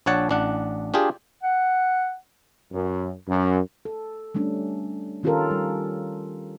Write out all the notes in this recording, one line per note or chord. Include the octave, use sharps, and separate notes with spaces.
A#1 D4 C#5 F#5 A5
A1 D4 F#5
D4 F4 G4 G#4
F#5
F#2
F#2
A4
G3 A3 C#4 D4
D#3 C#4 F4 G4 A4 A#4
G3